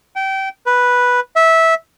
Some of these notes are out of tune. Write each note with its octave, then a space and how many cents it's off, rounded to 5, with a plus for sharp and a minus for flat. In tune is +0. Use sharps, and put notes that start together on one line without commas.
G5 -25
B4 -5
E5 -15